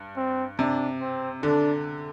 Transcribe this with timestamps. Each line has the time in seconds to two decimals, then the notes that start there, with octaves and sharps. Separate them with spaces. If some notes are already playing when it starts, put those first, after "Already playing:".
Already playing: G2
0.17 C4
0.59 C3 D4
1.01 C4
1.43 D3 D4